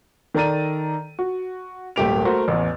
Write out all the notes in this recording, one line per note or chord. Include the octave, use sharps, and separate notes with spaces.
D#3 A4 D5 A#5 A6 D#7
F#4
D#1 G#1 A3 G4 D7 F7
A3 F#4 A#4 C5
A1 E2